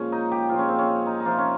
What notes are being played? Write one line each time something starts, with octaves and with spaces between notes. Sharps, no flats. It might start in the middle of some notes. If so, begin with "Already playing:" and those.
Already playing: A#2 F3 G#3 C#4
D#4
G4
A#2 F3 G#3 F4
C#4
C4
C#4
D#4
D#4
C3 F3 A#3 F4
C#4